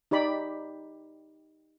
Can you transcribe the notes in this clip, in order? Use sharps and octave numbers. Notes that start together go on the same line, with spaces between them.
D#4 G4 D5 B5